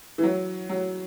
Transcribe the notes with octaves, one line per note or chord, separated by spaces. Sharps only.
E3
F#3
F#3